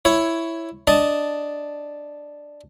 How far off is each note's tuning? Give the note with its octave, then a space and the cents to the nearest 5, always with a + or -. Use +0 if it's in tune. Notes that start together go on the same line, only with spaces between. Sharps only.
E4 +5 C#5 +0
D4 +0 D#5 +0 A5 +0